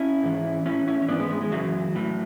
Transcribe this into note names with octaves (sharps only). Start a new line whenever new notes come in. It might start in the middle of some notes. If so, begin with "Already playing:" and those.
Already playing: C#4 E4
G#2 E3
A2 E3 C#4 E4
C#4 E4
C#4
G#2 E3 B3 D4
G#3 B3
G#3
G#3
F#2 C#3 E3 F#3
A2 E3